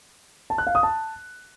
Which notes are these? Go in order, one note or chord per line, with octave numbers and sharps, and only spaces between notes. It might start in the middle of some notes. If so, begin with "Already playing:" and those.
A5
F#6
F5
D#6
A5